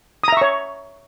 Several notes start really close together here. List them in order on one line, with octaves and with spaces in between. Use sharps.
D#6 A#5 E5 C#6 C#5